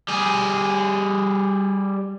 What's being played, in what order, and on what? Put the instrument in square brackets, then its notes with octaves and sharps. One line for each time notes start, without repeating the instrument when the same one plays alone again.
[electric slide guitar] G3 G#4